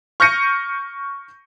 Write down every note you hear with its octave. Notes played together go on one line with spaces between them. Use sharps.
C#6 F6 G6 A#6 C#7 D#7